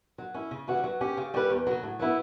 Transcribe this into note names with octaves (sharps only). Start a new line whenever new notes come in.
F#3
C#4 E4
C#3
E3 G3 C#4 F#4
F#3
C#4 G4
C#3
G3 C#4 G4 B4
E2
C#3 F#3
A2
F#3 B3 E4